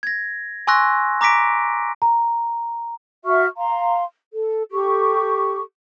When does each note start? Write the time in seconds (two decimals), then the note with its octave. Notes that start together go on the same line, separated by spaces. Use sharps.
0.03 G#6 A#6
0.67 G#5 C6 C#6 E6 F#6 A#6
1.21 A#5 D6 A#6 B6 D7
2.02 A#5
3.25 F#4 E5 C#6 F6
3.57 F5 A#5 C6
4.33 A4
4.72 G4 A4 C#6